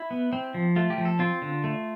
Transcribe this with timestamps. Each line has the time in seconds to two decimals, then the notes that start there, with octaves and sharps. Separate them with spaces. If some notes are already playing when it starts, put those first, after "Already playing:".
Already playing: E4
0.11 B3
0.33 C4
0.54 F3
0.76 A3 F4
0.90 G4
0.98 F3
1.05 A4
1.19 C4 F4
1.42 D3
1.64 A3